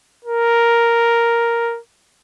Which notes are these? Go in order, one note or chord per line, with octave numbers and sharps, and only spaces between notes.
A#4